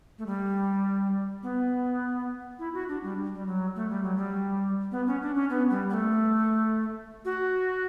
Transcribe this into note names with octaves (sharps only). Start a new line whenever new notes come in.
A3
G3
B3
E4
F#4
D4
G3
G3
F#3
A3
G3
F#3
G3
B3
C#4
D4
C#4
B3
G3
B3
A3
F#4